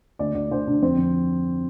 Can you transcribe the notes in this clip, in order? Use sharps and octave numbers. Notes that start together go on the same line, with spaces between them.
D2 D5
D2 D5
D3 C5
D3 D4
F2 C4
F2